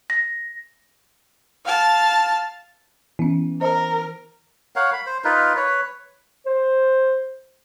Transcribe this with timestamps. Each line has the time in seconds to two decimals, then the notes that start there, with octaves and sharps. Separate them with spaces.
0.10 A#6
1.65 F5 A5
3.19 E3 B3 C#4
3.61 A#4 C5 D#5 A#5
4.76 A#4 C#5 F5 F#5
4.93 B5
5.06 C5
5.24 D#4 F4 A#4 B4
5.57 B4 C#5
6.46 C5